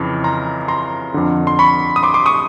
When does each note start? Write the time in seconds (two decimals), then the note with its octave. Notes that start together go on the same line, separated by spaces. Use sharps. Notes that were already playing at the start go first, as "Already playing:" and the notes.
Already playing: F2 C#3 E3
0.24 A#5 C6
0.68 A#5 C6
1.14 F2 D3
1.47 C6
1.59 B5 C#6
1.96 D#6
2.03 C6 D6
2.14 C6 D6
2.26 C#6 D#6